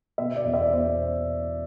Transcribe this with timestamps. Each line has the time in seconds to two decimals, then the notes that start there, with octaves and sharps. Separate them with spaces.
0.18 B2 E5
0.36 D5
0.45 E2
0.54 E5
0.63 D5
0.72 B2 C5